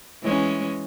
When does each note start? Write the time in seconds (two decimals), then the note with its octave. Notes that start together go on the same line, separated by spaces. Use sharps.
0.21 E3 G#3 C#4